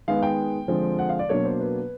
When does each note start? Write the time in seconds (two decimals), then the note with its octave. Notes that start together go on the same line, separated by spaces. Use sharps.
0.08 D#3 G#3 B3 F5
0.23 G5
0.68 D3 F3 G#3 C4
0.99 F#5
1.09 F5
1.19 D5
1.29 B2 F#3 A#3 D4 C#5
1.45 C5
1.60 B4